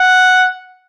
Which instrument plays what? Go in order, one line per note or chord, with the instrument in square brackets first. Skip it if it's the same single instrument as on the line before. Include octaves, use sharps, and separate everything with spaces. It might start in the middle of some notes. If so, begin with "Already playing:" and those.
Already playing: [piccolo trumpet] F#5